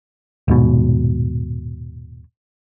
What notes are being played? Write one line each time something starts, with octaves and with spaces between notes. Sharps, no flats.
D#1 G#2 B2